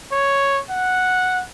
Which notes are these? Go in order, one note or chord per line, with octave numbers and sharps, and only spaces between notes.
C#5
F#5